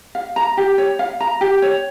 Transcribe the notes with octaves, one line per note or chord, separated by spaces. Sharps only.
F5
A#5
G4
C#5
F5
A#5
G4
C#5